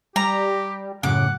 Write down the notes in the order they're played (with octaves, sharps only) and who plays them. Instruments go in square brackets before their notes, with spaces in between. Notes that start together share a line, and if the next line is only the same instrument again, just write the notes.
[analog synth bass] G3 [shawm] G4 [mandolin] A#5
[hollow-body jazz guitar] F#2 A2 C#3 [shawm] F#5 [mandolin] D6